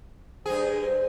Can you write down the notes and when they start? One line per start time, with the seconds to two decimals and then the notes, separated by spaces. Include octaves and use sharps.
0.46 G2 G#4 C5
0.82 C5